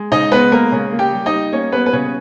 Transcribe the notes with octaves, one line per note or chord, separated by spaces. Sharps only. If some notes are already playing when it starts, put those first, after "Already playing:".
Already playing: G#3
C#3 D#4 D#5
G#3 B3 B4
G#3 A#3 A#4
C#3
A#3
G4 G5
G3
D#4 D#5
G3
A#3 C#4 C#5
G3 B3 B4
B4
C#3 C#4 C#5